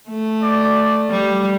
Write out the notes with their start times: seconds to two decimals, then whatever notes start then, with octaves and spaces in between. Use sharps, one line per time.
0.09 A3
0.42 D5
1.10 G3